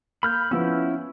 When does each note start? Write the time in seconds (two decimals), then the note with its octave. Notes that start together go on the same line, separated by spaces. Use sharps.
0.23 A#3 B5 F6 G6
0.51 F3 B3 C#4 E4 E6